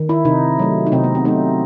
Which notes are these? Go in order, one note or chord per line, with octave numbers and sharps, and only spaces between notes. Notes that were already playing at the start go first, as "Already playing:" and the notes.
Already playing: D#3
E4
C3 D#4
F#3 A3
D#4
C3 C4
B3
C4
F#3 A3 D#4